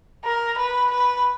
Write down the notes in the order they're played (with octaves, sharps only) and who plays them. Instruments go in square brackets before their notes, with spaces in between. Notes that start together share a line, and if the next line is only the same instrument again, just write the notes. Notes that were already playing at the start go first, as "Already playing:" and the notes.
[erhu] A#4
B4
B4